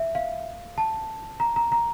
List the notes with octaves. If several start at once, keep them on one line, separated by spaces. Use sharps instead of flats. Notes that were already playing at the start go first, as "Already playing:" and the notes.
Already playing: E5
F5
A5
A#5
A#5
A#5